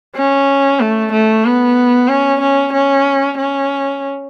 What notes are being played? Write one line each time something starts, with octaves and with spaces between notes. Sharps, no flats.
C#4
A3
A3
B3
C#4
C#4
C#4
C#4